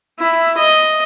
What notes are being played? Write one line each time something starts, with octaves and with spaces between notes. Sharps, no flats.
E4
D#5